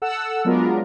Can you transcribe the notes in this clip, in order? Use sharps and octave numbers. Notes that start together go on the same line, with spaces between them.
A4 F#5 E6
F#3 G#3 B3 D4 F4 A#4